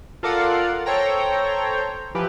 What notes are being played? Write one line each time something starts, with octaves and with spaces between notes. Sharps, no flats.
F4 A4 A#4 D5 F5 F#5
A4 C5 C#5 G5 A#5
E3 F3 G4 B4